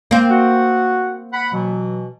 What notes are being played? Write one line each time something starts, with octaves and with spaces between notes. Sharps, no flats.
A#3 C4
F#4 F#5
F#5 B5
B2 E3 F#3